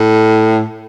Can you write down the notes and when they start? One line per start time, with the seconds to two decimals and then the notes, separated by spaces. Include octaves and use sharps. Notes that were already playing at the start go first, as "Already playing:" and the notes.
Already playing: A2